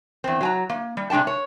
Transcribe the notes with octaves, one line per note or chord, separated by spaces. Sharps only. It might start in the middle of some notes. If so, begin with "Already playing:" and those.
E2 C4
F#3 G#5 A#5
A#3
G3
C3 G#3 D4 G5 A5
C#5